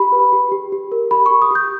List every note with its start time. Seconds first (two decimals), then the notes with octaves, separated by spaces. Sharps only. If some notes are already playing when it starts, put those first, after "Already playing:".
Already playing: G4 B5
0.12 B4
0.33 G4
0.52 G4
0.72 G4
0.92 A#4
1.11 G4 B5
1.26 C#6
1.31 G4
1.42 D#6
1.51 G4 G6